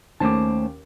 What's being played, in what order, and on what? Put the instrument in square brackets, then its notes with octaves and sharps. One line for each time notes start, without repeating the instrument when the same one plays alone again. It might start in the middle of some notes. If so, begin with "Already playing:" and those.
[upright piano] D#2 C#4 D6 [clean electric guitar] A3 C5 A5